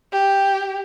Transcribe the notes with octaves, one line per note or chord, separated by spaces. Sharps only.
G4